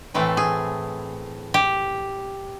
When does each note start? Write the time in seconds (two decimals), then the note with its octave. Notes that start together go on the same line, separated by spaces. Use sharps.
0.14 A2 E3 A3 C4
0.37 G#4
1.54 G4